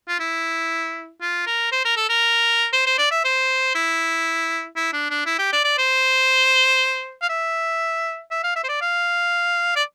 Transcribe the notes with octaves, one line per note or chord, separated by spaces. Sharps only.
F4
E4
F4
A#4
C5
A#4
A4
A#4
C5
C5
D5
E5
C5
E4
E4
D4
D4
E4
G4
D5
D5
C5
F5
E5
E5
F5
E5
C5
D5
F5
D5